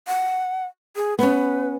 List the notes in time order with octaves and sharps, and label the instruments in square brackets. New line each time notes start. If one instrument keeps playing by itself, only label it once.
[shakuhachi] F#5
G#4
[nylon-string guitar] B3 C#4 [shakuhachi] B4